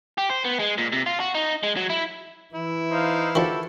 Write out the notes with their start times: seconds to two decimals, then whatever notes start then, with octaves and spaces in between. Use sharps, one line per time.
0.18 G4
0.30 C5
0.45 B3
0.60 G#3
0.78 A#2
0.92 C3
1.06 F4
1.20 F#4
1.35 D#4
1.63 G#3
1.77 F#3
1.90 E4
2.55 E3 E4
2.90 D#4 C5 F5
3.35 D#3 F3 F#4 G4 A4